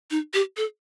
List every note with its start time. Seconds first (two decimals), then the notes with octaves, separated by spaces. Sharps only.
0.11 D#4
0.34 G4
0.57 A4